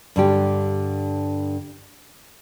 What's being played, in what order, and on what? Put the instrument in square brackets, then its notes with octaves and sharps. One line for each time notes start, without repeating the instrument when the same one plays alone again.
[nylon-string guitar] G2 D3 G4